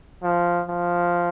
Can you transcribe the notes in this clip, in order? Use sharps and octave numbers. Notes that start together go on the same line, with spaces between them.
F3
F3